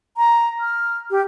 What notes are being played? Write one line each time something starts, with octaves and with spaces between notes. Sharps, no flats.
A#5
F6
G4